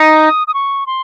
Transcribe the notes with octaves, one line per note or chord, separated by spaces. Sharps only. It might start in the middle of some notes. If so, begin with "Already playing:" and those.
Already playing: D#4 D#6
D#6
C#6
C6